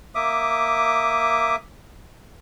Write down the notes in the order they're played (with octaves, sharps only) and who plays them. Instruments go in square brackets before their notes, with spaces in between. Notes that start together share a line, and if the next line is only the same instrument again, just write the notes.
[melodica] A#3 E5 D6 D#6